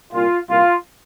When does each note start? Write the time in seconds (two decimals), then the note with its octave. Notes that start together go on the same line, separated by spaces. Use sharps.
0.12 C2 A#2 F4
0.48 C2 A#2 F4